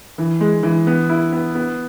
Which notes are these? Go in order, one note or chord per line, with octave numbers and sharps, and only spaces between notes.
E3
G#3
E3
B3
E4
B3
B3